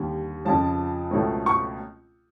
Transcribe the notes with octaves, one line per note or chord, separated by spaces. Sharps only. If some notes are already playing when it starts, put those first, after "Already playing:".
Already playing: D#2 D3 G3
F2 C#3 F3 A5
C#2 B2 F#3 A3 C4
C#6